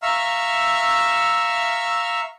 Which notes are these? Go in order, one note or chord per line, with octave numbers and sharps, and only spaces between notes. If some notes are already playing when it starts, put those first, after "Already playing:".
E5 F5 A#5 C#6 E6 F6